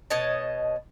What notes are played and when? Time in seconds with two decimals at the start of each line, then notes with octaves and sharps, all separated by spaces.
0.10 B2 C#5 D#5 A5